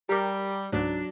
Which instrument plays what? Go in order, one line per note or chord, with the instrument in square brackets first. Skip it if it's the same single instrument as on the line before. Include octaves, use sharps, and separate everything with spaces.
[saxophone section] G3 [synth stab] G4 A#4 [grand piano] A#5 D6
[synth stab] C#2 G#2 [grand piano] F#3 [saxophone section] D4